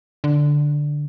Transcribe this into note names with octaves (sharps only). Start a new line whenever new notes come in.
D3